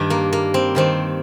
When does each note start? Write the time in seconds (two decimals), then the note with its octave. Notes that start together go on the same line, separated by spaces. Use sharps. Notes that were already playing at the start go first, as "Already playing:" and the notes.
Already playing: G2 D#3 D4
0.10 A#3
0.33 A#3
0.54 C4
0.75 G2 D#3 C4